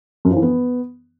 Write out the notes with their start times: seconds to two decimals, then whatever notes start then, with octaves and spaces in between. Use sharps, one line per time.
0.25 F#2
0.31 F3
0.37 E3
0.42 B3